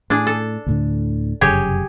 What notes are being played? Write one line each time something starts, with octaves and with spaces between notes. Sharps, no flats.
A2 D4 G#4
A4
D2 A2 D3
F1 F#2 C#3 G4 G#4 C#5